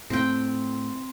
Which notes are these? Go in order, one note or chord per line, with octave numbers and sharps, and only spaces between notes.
A2 C4 G5